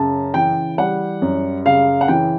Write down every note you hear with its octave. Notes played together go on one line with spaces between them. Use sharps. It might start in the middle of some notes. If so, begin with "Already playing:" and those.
Already playing: F#2 C#3 A5
E3 G5
G3 F#5
F#2
C#3 F5
F#5
E3 G5